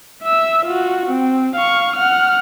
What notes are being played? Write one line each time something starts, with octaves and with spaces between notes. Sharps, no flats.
E5 E6
F4 F#4
C4
F5 C#6
F#5 F6